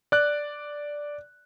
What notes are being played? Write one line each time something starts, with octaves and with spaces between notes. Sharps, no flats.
D5 F#6